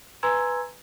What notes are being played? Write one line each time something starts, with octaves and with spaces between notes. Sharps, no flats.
B4 G#5 A#5 C6 E6 G#6